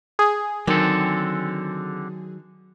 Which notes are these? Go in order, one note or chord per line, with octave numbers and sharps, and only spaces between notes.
G#4
D3 D#3 F#3 C4 A4